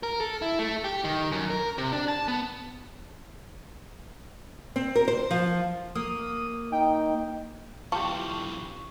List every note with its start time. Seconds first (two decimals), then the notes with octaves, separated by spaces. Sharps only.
0.03 A#4
0.21 A4
0.42 E4
0.59 A3
0.84 G4
1.04 D#3
1.32 F#2
1.50 A#4
1.78 C3
1.93 D4
2.08 A5
2.28 B3
4.76 C4
4.96 A#4
5.08 C5
5.31 F3
5.95 A#3 D#6
6.72 D#4 G5
7.92 B1 E3 F4 G4 A5 C#6